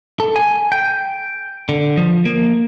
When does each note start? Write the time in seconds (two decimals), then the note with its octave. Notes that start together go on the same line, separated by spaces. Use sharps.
0.20 A4
0.36 G#5
0.72 G5
1.69 D3
1.97 F3
2.25 A#3